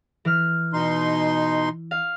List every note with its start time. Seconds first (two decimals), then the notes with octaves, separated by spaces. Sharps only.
0.25 E3 F6
0.73 B2 D#4 C6
1.91 F5